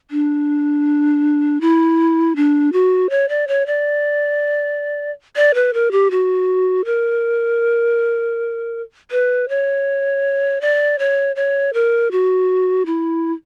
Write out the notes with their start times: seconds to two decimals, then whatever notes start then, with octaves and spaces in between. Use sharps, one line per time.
0.11 D4
1.61 E4
2.36 D4
2.73 F#4
3.10 C#5
3.29 D5
3.48 C#5
3.66 D5
5.36 D5
5.54 B4
5.74 A#4
5.91 G4
6.11 F#4
6.85 A#4
9.11 B4
9.49 C#5
10.61 D5
10.99 C#5
11.36 C#5
11.73 A#4
12.11 F#4
12.86 E4